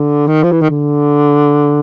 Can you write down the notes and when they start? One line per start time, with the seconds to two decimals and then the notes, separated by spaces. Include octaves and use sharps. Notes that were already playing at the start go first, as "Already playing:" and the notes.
Already playing: D3
0.27 D#3
0.44 F3
0.52 E3
0.61 D#3
0.70 D3